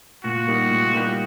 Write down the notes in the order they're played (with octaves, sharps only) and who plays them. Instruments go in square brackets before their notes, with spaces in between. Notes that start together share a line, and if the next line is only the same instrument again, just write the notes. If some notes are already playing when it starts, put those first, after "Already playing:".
[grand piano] A#2 [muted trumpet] F#4
[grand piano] G3 A#3 D#4 G4
A#2
G3 A#3 D#4 G4